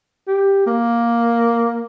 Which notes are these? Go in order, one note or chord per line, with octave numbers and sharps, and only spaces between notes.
G4
A#3